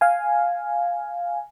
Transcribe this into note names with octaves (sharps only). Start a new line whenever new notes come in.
F5 G#5